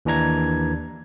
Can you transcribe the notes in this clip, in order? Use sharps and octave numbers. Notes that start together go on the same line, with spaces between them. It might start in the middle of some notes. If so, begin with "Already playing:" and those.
D#2 E3 D4 A#5 G#6